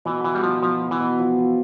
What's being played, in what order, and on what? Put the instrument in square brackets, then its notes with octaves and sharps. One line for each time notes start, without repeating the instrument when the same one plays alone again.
[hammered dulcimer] B2 [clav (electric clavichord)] E3
[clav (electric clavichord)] E3 [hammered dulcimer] E4
[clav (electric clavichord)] G3
[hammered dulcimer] B2 [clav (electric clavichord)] F3
[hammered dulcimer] B2 [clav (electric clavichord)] F3
[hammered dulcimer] B3
[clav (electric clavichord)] E3
[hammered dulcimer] B2
F3
F3